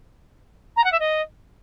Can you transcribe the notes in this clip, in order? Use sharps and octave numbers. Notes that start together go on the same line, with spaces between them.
A#5
F#5
E5
D#5